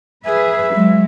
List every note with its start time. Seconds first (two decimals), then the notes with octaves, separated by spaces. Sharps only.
0.25 G#4 B4 E5
0.73 F#3 G#3